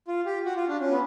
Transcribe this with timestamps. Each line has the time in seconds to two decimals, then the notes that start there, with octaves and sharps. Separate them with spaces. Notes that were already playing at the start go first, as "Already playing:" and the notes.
0.08 F4
0.26 G4
0.45 F#4
0.56 F4
0.68 D4
0.81 C#4
0.91 B3